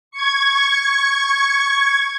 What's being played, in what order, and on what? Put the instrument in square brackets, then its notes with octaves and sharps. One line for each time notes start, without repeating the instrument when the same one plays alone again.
[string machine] C#6 G#6